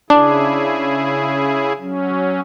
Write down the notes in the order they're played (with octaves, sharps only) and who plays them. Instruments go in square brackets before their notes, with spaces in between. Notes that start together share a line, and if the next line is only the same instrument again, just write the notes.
[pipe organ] C#3 E4 G#4 [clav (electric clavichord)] D4
[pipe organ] F#3 C#4